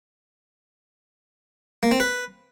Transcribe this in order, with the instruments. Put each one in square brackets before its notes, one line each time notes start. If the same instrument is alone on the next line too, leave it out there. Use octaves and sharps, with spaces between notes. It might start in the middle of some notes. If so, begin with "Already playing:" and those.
[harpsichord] A#3
C4
B4